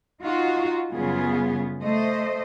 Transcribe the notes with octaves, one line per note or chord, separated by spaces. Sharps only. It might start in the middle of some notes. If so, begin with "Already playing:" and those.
D#4 F4 F#4
F#2 C#3 G3 B3 F4 G#4
A3 C5 D#5